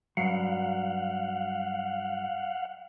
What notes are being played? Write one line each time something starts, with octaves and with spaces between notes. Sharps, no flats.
G2 F#3 F5 F#5